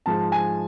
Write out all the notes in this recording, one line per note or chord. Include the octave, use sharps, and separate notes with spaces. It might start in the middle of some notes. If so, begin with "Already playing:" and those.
G#2 F3 G#3 A5
G#5